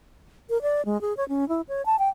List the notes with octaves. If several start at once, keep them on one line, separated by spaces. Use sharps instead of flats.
A#4
D5
G#3
G#4
C#5
C#4
E4
C#5
A5
G5